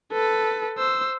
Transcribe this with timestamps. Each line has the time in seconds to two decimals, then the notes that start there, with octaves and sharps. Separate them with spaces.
0.12 A4 B4
0.78 C5 E6